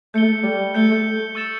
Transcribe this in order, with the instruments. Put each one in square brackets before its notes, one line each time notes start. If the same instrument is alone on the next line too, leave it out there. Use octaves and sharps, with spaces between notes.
[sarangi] A3 [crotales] G6 C#7 G7
[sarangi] G3
[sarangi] A3 [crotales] G6 C#7 G7
[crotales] C#6 E6 A6 E7